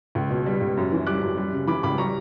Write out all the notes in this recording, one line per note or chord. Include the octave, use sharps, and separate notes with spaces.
C#2
B2
G3
C#2
F#2
E3
G3 D6 F#6
F#2
G3
C#3
E3 B5 D6
C#2 B5 D6
G3 A#5 C#6